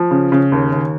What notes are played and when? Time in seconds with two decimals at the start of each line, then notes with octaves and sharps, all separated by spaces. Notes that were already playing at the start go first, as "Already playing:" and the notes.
Already playing: F3
0.11 C#3
0.32 C#3
0.52 D#2
0.72 D#2